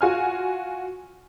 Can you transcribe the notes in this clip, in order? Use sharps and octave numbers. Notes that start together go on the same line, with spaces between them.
F4 F#4 G#5 F6